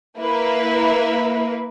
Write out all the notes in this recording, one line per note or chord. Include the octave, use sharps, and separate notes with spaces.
A#3 E4 B4